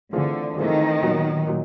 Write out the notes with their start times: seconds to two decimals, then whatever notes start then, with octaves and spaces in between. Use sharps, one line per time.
0.13 D3 E3 A3 C4 F4 G#4
0.57 D#3 E3 A3 C4 F4 G#4
1.02 A#2 F#3 B3
1.47 A#2 F#3